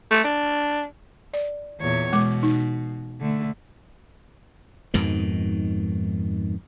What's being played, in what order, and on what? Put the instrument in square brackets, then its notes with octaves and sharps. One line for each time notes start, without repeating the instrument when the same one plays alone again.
[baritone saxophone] A3
D4
[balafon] D5
[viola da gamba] E2 A#2 C#5
[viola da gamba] B2 [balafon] G#3 D6
[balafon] D#4
[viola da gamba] D3 A3
[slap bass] F2 G#2 B2 D#3